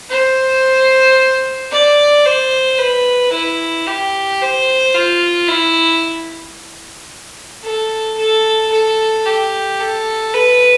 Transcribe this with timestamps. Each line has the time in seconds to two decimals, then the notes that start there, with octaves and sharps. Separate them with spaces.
0.10 C5
1.71 D5
2.25 C5
2.79 B4
3.33 E4
3.87 G4
4.41 C5
4.95 F4
5.48 E4
7.64 A4
8.18 A4
8.72 A4
9.25 G4
9.80 A4
10.34 B4